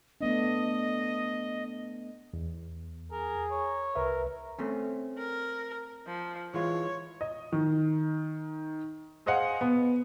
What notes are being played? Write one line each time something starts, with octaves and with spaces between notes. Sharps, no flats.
A3 B3 D4 D#5
E2
G#4 A#4
C#5
C2 A#4 B4 E5
A3 C4 C#4
A#4
F3
E3 G#3 F4 C#5
D#5
D#3
G#4 C5 D#5 F5 F#5 G#5
B3